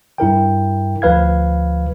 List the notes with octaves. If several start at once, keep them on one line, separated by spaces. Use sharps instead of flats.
G2 E4 A#4 G5
D2 F3 B4 F5 G#6